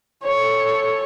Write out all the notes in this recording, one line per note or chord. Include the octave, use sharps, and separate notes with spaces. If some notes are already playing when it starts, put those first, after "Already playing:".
A4 C#5